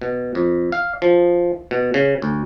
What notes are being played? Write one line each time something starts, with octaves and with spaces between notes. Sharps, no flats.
B2
F2
F5
F3
B2
C#3
D2